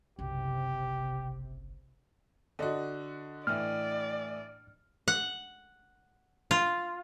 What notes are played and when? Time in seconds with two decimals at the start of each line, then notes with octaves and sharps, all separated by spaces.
0.19 F#1 B1 C3 G4
2.59 D3 D4 F#4 D#5
3.47 A2 E3 D5 F6
5.08 F#5
6.51 F4